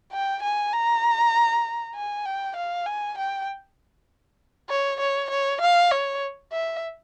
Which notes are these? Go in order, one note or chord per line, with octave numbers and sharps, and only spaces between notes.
G5
G#5
A#5
G#5
G5
F5
G#5
G5
C#5
C#5
C#5
F5
C#5
E5